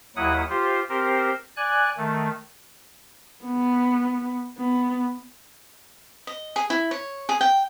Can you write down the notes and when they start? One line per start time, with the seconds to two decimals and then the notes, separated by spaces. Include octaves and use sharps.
0.16 D#2 F#3 E4 F#5 D#6
0.50 F4 G4 C5
0.89 C4 G4 A#4 C5
1.57 D5 G#5 F#6
1.98 D#3 A3
3.45 B3
4.58 B3
6.27 D#5
6.56 G#4
6.70 E4
6.91 C#5
7.29 G#4
7.41 G5